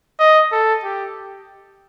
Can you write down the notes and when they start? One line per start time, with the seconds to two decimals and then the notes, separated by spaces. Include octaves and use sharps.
0.20 D#5
0.52 A4
0.84 G4